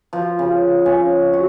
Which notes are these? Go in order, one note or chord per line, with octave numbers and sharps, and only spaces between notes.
F3
C#3
C#4
F#4